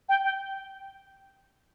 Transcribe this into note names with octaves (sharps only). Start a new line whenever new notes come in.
G5
G5